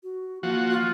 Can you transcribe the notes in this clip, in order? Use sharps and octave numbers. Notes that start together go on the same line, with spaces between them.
F#4
F3 A#3 F#4
F4